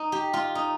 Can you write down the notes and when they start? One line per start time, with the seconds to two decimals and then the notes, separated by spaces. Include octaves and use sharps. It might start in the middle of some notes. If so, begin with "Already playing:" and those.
Already playing: D#4
0.12 G4
0.33 F4
0.55 D#4